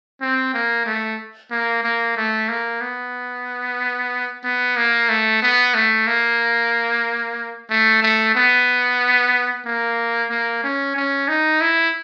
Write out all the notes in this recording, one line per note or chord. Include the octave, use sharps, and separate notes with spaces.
C4
A#3
A3
A#3
A#3
A3
A#3
B3
B3
A#3
A3
B3
A3
A#3
A3
A3
B3
A#3
A#3
C#4
C#4
D#4
E4